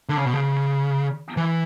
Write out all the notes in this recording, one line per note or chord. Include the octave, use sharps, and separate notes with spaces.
D3
C#3
B2
C#3
E3